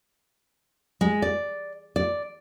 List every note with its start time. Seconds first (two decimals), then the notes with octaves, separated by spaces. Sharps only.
1.01 G#3
1.22 D5
1.96 D5